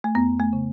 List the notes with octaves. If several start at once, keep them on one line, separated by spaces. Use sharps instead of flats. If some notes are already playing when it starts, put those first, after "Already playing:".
A3
F2 B3
A3
C#3